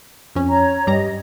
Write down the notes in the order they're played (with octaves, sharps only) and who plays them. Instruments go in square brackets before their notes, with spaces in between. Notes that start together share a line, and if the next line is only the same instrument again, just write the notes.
[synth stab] F2 C#4
[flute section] C#5 A#5
[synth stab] G2 G3 A#5 [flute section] D#5